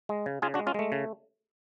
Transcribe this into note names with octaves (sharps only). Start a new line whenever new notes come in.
G#3
C#3
C#3 F4 G#4
D4 F#4
G#3
C#4 F4
G#3 A3
C#3